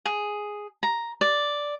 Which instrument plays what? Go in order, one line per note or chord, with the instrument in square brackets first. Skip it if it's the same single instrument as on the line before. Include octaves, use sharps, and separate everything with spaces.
[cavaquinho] G#4
A#5
D5